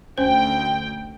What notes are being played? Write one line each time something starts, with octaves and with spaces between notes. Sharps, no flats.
D2 C#4 C5 G5